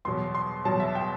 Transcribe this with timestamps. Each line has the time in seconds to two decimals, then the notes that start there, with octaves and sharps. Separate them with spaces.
0.05 E2 B2 F#3 C6
0.35 C6
0.65 E2 B2 F#3 A5
0.80 E5
0.95 G5